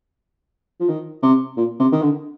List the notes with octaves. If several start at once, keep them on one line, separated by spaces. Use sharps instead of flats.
F3
D#3
C3
A#2
C3
D#3
D3